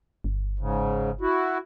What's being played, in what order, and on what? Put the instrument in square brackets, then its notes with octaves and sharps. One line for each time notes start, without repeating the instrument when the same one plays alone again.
[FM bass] G1
[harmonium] G#2 C#3
E4 F#4